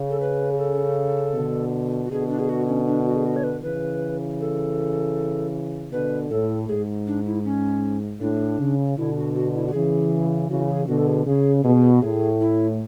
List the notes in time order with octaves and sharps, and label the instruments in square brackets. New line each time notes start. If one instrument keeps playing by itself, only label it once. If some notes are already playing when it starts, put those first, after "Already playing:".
Already playing: [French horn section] C#3
[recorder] A4
B4
G#4
A4
[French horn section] B2 D3
[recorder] F#4
[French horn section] B2 D3 [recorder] G#4
[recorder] D4
G#4
F#4
C#4
D4
F#4
G#4
F#4
C#5
B4
[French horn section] C#3 E3 [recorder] B4
[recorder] A4
[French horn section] B2 D3 [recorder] B4
[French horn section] A2 [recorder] A4
[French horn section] G#2 [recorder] G#4
[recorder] D4
E4
C#4
[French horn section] A2 [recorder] D4
[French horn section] C#3
[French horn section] B2 D3 [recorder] E4
[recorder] F#4
F#4
E4
F#4
[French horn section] C#3 E3 [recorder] G#4
[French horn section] C#3 E3 [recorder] F#4
[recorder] G#4
[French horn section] B2 D3 [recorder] F#4
[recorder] A4
G#4
[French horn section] C#3 [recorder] G#4
[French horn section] B2 [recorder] G#4
[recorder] F#4
[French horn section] A2 [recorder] G#4
[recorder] E4